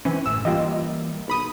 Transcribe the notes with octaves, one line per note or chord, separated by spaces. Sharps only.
E3 C4 C#4
G1 A2 E6
E3 G3 A#3 F4 G4 D#5
B1 B5 D#6